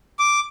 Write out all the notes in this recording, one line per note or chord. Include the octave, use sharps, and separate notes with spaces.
D6